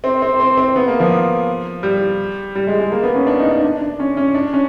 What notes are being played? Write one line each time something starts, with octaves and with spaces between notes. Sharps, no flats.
C4
C4
C4
C4
B3
A#3
F3
G3
G3
G#3
G#3
A#3
B3
C#4
D4
D#4
D4
D4
D4
C#4
C#4
D4
C#4